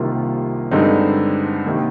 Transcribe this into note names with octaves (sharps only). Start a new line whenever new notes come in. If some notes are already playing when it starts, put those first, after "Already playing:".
Already playing: C2 C3 D#3 A#3 F4
G2 D3 G#3 C4 D#4
C3 D#3 A#3